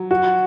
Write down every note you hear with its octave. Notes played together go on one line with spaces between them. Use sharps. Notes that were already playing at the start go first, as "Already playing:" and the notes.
Already playing: F#3
F#4